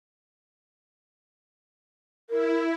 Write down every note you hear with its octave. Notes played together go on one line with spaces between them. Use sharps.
E4 A#4